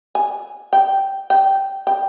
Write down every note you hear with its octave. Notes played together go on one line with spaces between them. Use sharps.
G#5
G5
G5
G5